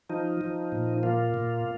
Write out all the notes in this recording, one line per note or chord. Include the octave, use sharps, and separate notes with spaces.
F3 D#4
F3
A#2
A#3 F4
A#2